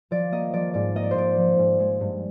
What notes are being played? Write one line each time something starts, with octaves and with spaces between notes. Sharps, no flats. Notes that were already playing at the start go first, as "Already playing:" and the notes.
F3 D5
A#3 D#5
F3 D5
G#2 D5
A#3 D#5
D5
C5
G#2 D5
F3
G#2
G#3
G2